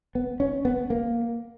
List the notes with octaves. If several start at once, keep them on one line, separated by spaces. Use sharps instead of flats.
B3
C#4
B3
A#3